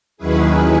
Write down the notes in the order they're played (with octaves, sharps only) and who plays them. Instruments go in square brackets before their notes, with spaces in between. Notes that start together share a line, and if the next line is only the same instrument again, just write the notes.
[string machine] D#2 D#3 F#3 C#4 E4 G#4 B4